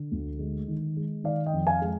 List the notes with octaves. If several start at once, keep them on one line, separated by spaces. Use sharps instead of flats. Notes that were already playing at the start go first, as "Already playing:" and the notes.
Already playing: D3
D2
G#3
D#3
G#3
D#3 D5 F5
D#5 G5
F2
F5 G#5
G#3